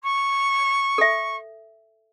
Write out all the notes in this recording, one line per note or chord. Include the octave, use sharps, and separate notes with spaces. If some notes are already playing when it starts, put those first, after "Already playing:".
C#6
A4 E5